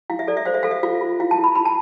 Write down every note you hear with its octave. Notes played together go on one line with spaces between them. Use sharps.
E4 F5
E5
A4 D5
E5
C5 F5
E5
A4 F5
E5
F4 F5
F4
E4 F5
A5
E4
B5
E4 B5
A5